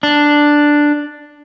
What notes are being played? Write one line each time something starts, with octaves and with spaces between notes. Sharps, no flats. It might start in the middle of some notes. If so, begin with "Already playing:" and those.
D4